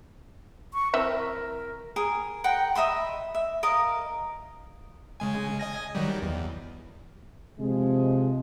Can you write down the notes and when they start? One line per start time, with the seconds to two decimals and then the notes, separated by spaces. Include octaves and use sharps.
0.74 C#6
0.94 E3 C4 A#4 E5
1.96 G#4 A#4
2.44 A#4 F#5 G5
2.75 D#5 E5 B5 C6
3.35 E5
3.63 A#4 D#5 F5
5.20 C#3 G#3 G#5
5.59 D#5 G#5 A#6
5.95 D#3 F#3 G3
6.22 E2
7.58 C3 F3 G#3